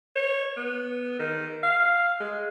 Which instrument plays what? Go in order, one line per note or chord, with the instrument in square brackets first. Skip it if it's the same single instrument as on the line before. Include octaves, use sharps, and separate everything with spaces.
[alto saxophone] C#5
B3
D#3
F5
G#3